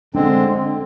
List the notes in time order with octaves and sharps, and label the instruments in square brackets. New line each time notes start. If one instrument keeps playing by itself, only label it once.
[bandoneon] D3 G#3 C4 [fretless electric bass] D4